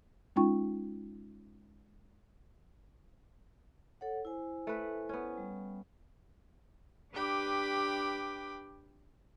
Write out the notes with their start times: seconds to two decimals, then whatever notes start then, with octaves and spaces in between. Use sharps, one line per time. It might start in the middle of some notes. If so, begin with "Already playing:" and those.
0.36 G#3 C#4 D#4 F4 G5 C#6
4.01 A4 C#5 F#5
4.25 E4 C5 G#5
4.67 A3 B4
5.09 B3 C#4
5.38 G3
7.12 D4 G4 B4 G5 B5 D6